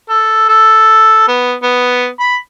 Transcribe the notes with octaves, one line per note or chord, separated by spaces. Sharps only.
A4
A4
B3
B3
B5